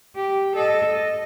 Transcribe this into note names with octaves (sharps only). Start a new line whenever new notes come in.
G4
A4 D#5
D#5